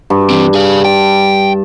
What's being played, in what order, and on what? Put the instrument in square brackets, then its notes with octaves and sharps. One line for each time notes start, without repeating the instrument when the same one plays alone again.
[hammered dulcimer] G2
[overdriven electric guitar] E3 C4
G#4 F5
[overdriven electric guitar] G5 [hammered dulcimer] A5